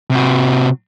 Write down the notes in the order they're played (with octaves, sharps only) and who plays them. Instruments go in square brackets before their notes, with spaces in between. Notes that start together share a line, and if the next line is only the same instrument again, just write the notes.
[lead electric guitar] C3 F#4